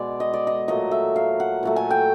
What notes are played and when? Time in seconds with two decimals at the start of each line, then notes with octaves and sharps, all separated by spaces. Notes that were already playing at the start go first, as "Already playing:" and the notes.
Already playing: B2 G#3 D5
0.20 D#5
0.33 D5
0.47 D#5
0.68 A#2 F#3 A3 D#5
0.91 E5
1.16 F5
1.40 F#5
1.63 A#2 F#3 A3
1.76 G#5
1.91 G5